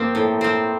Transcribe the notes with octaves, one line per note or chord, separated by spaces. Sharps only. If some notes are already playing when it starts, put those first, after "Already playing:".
Already playing: F3 A#3 C4
A2
F3 C4